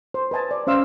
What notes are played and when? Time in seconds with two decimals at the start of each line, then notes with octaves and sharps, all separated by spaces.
0.14 C5
0.31 B4 D#5 G#5 A5
0.51 D5
0.67 C#4 C5 F5 E6